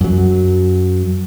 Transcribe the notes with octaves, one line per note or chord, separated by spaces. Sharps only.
F#2 F#3